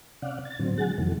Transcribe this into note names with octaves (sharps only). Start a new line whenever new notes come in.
C3 C#4 D5 F5 F#5
A6
A2 D3 F#3 C4
D3 F#3 G#3 G#4 F#5 A6
F2 C3 D#3 E3 F#3 A3